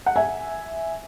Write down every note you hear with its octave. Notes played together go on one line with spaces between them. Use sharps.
F#5
E5 G#5